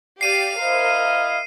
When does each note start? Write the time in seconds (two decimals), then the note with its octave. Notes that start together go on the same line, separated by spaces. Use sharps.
0.21 G4 D5 F5 C7 D#7
0.59 E4 A#4 C5 D#5 F5